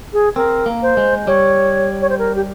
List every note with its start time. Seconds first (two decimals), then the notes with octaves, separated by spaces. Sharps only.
0.13 G#4
0.36 C4 A#4
0.66 A#3
0.82 C5
0.97 G#3
1.27 G3 C#5
2.02 C#5
2.10 C5
2.19 A#4
2.36 G4